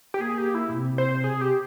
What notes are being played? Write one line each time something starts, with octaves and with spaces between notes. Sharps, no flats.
G4
A#3 G#4
G4
E4
C3
C5
G#4
G4